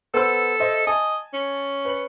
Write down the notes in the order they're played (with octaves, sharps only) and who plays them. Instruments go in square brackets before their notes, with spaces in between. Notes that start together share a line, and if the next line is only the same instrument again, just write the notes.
[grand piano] B3 C5 E6 [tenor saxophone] A4
[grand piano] C5 D#5 E5
[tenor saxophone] D#5 [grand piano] G#5 A5
[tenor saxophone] C#4
[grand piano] B4 F#7